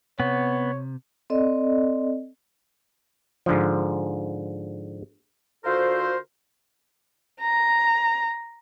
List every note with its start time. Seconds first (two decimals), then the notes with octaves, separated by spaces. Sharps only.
0.20 C3 B3 C#5
1.30 C4 A4 D5 D#5
3.46 G#2 D3 F3
5.65 D3 F4 F#4 A4 A#4 C5
7.41 A#5